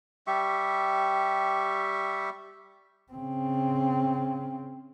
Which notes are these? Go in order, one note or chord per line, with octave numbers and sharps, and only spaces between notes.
G3 G4 E5 C#6
C#3 C4